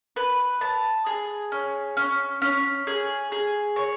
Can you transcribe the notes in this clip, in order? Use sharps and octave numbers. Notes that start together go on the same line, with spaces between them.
B4
A5
G#4
C#4
C#4
C#4
G#4
G#4
C#5